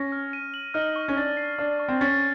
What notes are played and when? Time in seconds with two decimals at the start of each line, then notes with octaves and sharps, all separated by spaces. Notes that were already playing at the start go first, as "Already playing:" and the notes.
Already playing: C#4 A#6
0.12 F6
0.33 D#7
0.54 F#7
0.74 D#4 F6
0.96 C#6
1.08 C#4
1.16 D4 A6
1.37 C7
1.58 D4 F6
1.80 C#6
1.88 C4
2.01 C#4 A6